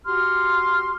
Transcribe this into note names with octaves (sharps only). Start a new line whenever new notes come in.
F#4 G4 C6 F6